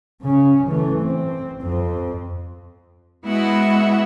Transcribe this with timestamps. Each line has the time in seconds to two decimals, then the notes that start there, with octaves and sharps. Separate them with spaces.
0.22 C#3 C#4
0.68 E3 A3
1.01 C4
1.62 F2 C4
3.24 G#3 B3 E4 F#4 E5 F#5